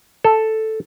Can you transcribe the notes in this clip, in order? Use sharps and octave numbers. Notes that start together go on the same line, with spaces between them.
A4